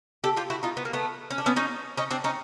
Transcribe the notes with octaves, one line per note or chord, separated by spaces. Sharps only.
G4 A4
F4 G4
E4 F#4
D#4 F4
B3
A#3
A3 B3
C#4
D4
B3 C#4
C#4 D#4
C#4 D#4
C4 D4
C#4 D#4